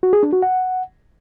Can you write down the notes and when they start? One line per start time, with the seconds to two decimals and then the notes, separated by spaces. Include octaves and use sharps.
0.03 F#4
0.13 G#4
0.23 D4
0.33 F#4
0.42 F#5